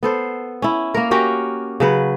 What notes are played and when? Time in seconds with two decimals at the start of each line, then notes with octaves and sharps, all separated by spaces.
0.03 B3 A4 C5
0.62 C#4 E4
0.94 A#3 A#4
1.11 C#4 F#4 G4 A#4
1.80 C#3 F#3 B4